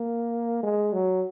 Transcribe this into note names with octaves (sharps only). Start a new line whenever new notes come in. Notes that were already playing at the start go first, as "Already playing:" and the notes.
Already playing: A#3
G#3
F#3